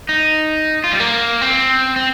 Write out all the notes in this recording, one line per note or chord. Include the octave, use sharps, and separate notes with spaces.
D#4
F4
G3
A#3
C4
C4